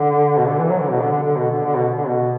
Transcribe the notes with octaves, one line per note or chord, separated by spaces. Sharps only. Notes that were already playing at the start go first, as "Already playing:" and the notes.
Already playing: D3
B2
D3
E3
F#3
D3
B2
D3
D3
D3
B2
D3
D3
B2
D3
B2